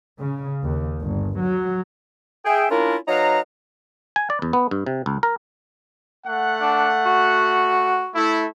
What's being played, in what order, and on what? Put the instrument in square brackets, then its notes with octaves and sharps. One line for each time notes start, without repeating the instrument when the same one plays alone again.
[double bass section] C#3
D#2
G1
F#3
[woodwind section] G#4 E5 G5
A#3 C#4 D4 E4 F4 A#4
F#3 D#4 B4 F5 A#5
[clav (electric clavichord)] G#5
D5
E2
B3
G2
C3
C#2
A#4
[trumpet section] A3 F#5
[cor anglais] D4
F#4
[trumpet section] A3 E4